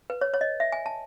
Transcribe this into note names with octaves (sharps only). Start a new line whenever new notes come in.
B4
C#5
C#5
D#5
E5
G#5
A5